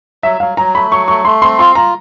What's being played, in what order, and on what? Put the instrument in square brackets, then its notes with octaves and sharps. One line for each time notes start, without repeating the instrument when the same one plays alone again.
[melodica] F#3 [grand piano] E5
[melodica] F#3 [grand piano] F5
[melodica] F#3 [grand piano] A#5
[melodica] A3 [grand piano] B5
[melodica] F#3 [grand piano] C#6
[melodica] A3 [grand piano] C#6
[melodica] A3 [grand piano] C6
[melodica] C4 [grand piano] C6
[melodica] F4 [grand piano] C6
[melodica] F4 [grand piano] A#5